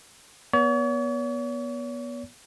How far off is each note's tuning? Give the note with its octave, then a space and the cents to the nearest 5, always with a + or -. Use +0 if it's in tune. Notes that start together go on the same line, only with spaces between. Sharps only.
B3 -25 C#5 +45